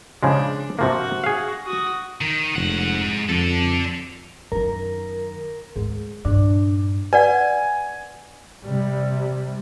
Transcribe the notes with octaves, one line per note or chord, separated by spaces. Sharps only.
C#3 F3 G#3 D4
C3 F3 A#3 F#4
G#4 F5
F#4 D#6
D#3
F1 G#2 F#5
F2 A4 D5
F#2 D#3 A#4
D2 G#2
G2 A#2 D4
B4 D5 F#5 G#5
C3 G3